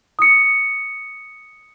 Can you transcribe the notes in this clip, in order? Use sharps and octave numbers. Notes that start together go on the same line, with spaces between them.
D#6 C#7